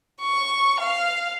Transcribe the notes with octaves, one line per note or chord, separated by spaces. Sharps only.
C#6
F5